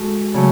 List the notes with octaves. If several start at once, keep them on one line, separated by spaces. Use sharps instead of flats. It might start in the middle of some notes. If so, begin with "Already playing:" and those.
Already playing: G#3 F#4 A4
C#3 F#3 A3